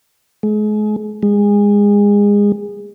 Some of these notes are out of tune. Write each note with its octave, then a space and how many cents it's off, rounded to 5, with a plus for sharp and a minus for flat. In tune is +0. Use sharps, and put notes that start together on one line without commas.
G#3 +35
G#3 -25